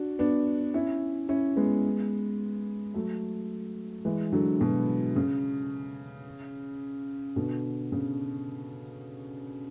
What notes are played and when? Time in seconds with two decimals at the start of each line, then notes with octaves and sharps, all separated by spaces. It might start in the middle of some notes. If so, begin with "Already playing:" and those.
Already playing: D4 F#4
0.19 B3 D4
0.74 C#4 E4
1.29 C#4 E4
1.56 G#3 B3
2.94 F#3 A3
4.05 E3 G#3
4.32 D3 F#3
4.61 B2
5.16 C#3
7.36 B2 D3
7.92 C#3